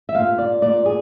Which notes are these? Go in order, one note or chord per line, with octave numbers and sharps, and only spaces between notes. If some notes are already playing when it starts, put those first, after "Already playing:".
E5
A#2 F5
D5
A#2 D5
G#4